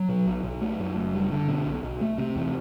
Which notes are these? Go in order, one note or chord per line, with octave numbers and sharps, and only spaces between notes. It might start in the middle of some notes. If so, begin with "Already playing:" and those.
Already playing: F#3
B2
B1
B1
A3
F#2
F#1
G3
D3
B2
B1
B1
A3
C3
E2